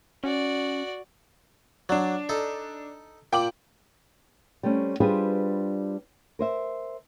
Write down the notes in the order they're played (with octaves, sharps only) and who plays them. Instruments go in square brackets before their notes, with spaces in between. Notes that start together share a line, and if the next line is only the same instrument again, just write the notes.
[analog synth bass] C#4 [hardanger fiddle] F#4 D5
[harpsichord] F#3 [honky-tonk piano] D4 D5
[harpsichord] D#4 A4
[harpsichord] A#2 [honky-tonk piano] G5 D6 F#7
[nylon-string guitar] G3 A3 C4 C#4
G3 D4 F4 G#4 B4 C5
A#4 C5 E5